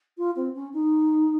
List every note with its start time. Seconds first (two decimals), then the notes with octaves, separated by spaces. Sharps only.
0.18 F4
0.36 C4
0.55 C#4
0.73 D#4